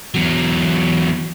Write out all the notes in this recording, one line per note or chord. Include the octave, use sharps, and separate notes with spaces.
E2 F#3